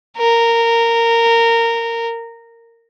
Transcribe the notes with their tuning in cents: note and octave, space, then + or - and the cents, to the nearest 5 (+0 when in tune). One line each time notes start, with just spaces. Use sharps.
A#4 -15